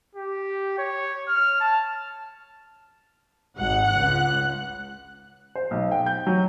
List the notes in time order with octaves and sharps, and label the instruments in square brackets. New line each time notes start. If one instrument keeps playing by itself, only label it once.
[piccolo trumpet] G4
C#5
F6
A5
[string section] G#1 [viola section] F#5
[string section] C#2 F#6
[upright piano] C5
B1
G5
G6
F#3